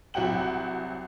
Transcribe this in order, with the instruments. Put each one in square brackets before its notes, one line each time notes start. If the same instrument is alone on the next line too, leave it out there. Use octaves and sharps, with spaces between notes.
[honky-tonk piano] C2 F#3 F#5 G5 F#7